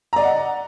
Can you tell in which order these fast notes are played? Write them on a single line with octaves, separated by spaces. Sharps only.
A#5 D5 D#5 F#5